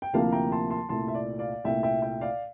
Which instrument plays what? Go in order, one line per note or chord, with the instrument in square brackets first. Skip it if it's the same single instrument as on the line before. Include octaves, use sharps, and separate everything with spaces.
[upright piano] G5
D2 C3 F3 A#3 E4 F5 A5
G5 A#5
A5 C6
A5 C6
C2 A#2 A3 A5 C6
E5
D5
D5 F5
C2 A#2 A3 E5 G5
E5 G5
E5 G5
D5 F5